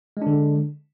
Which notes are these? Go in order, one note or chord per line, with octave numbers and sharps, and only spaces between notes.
D3 G#3 D4